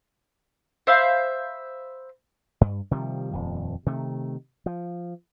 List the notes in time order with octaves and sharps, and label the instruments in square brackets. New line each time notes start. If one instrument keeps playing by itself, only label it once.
[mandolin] C5 E5 F5 B5
[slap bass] G2
C3 D#3 F3 G3
D#1 F2
C3 D#3 A3
F3